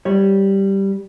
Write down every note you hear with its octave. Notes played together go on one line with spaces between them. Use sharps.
G3 C#5